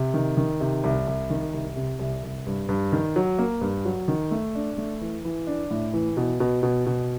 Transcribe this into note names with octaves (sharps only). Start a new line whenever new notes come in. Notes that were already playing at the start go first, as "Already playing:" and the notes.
Already playing: C3
D#3
D#3
C3
C2
C2
D#3
C2
C3
C2
C2
G2
G2
D#3
F#3
A#3
G2
F#3
D#3
A3
D4
A3
E3
E3
D4
A2
E3
B2
B2
B2
B2